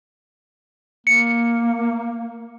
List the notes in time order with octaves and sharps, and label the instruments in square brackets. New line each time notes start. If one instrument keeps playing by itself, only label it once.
[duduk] A#3 [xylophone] C#7